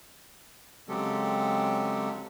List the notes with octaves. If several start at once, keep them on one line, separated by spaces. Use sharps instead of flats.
C#3 F#3 G#3 C4 G4 A4